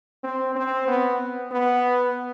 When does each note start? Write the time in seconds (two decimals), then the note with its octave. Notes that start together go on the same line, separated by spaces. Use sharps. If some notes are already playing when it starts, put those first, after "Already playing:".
0.24 C4
0.55 C4
0.87 B3
1.52 B3